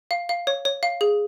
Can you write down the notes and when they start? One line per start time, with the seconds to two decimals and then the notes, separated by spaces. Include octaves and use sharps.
0.11 F5
0.29 F5
0.47 C#5
0.65 C#5
0.83 F5
1.01 G#4